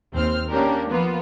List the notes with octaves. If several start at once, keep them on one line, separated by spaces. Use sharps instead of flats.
D#2 C4 C5 F6
A#3 C#4 D4 G4 A#4
F3 A#3 B3 F4 B4